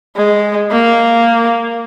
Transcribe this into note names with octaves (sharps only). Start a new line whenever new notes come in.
G#3
A#3